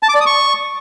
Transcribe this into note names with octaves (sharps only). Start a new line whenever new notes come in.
A5
D6
D5
D#6
C#6